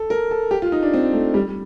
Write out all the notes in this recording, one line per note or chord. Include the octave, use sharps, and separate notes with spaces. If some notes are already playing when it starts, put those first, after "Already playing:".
Already playing: A4
A#4
A4
G4
F4
D#4
D4
C4
A3
G3